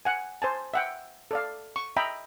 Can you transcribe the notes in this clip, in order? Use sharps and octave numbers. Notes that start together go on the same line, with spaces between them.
F#5 G#5
C5 G#5 A5
E5 F#5 G5
A4 D5 F5
C#6
D#5 E5 G5 A#5 B5